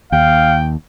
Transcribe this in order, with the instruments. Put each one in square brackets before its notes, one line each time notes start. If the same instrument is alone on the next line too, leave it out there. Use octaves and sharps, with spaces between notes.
[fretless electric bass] D#2 [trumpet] F5 [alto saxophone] G5